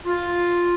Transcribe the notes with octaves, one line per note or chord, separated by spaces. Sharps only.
F4